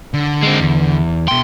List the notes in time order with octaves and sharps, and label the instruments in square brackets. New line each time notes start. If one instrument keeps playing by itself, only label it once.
[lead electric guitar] D3
[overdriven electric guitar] G#3 C4
E2
[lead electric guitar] B2 G5 [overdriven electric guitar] C6